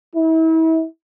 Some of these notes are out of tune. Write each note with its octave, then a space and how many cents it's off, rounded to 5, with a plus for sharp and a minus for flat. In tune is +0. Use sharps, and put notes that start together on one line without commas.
E4 -35